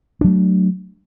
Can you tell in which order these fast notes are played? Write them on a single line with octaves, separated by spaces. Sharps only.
D4 F#3 A3